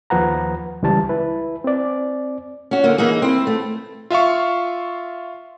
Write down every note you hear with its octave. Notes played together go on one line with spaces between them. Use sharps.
D#2 F3 B4 F#5 A#5
C#2 E3 G3 A5
E4 B4
C4 D5
C#4 F#4
D3 A#3
E3 A#3 D#4 G#4
C4 E4
A3
F4 E5 F5 C#6